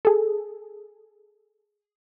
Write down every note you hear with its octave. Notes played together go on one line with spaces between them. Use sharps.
G#4 A4